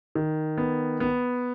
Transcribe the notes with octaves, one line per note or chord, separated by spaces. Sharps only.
D#3
B3
B3